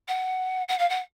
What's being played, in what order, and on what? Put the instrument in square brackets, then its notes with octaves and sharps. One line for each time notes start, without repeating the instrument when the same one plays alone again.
[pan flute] F#5
F#5
F5
F#5